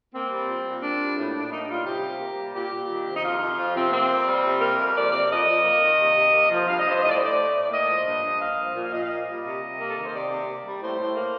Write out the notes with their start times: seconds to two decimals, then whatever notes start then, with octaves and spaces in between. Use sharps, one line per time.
0.13 A#3 C4
0.30 G3
0.48 A#2
0.65 A#2
0.81 A#3 D4
0.99 G3
1.16 A2
1.34 A2 D4
1.50 A#3 D#4
1.68 G3 F4
1.84 C3 G4
2.02 C3
2.19 A#3
2.36 G3
2.54 A#2 G4
2.72 A#2
2.88 D#3
3.05 C3
3.16 D#4
3.23 F2 F4
3.40 F2
3.58 F3 F4
3.75 C3 C4
3.91 A#3 C4
4.09 F2
4.27 G3
4.43 C3
4.61 A#3 A#4
4.78 F2
4.95 F3 D5
5.12 C3 D5
5.30 F2 D#5
5.47 F2
5.64 A#3
5.82 D#3
5.99 C3
6.16 C3
6.32 A#3
6.50 F3
6.68 G2 F5
6.79 D#5
6.84 G2
6.90 C5
7.02 A2 D#5
7.09 D5
7.16 C5
7.19 A3 D5
7.37 A3
7.54 A2
7.61 D5
7.70 A#3 D#5
7.88 F3
8.05 G2
8.22 G2
8.39 A#3 F5
8.57 F3
8.74 A#2
8.83 F5
8.91 A#2 D#5
9.01 F5
9.08 A#3 D#5
9.26 G3
9.43 C3
9.61 C3
9.78 A#3
9.90 A4
9.95 D#3 A#4
10.05 C5
10.12 C3 D5
10.30 C3
10.46 A#3
10.64 G3
10.81 A2 C5
10.98 A2
11.15 A#3